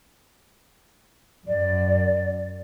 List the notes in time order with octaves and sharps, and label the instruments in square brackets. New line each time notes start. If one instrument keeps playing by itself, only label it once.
[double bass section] F#2 [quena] D5